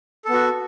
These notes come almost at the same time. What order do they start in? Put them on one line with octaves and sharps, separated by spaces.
A4 B3 F#4